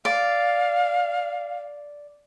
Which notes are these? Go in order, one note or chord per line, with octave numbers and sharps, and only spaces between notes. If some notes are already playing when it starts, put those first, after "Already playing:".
D5 F5